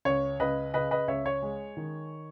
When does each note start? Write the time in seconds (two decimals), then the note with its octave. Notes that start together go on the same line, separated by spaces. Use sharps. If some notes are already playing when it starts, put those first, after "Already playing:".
0.05 C#2 C#5
0.40 C#2 B4 D#5
0.74 C#3 B4 D#5
0.91 B4 D#5
1.08 C#2 C#5 E5
1.26 C#5
1.42 G#3
1.77 D#3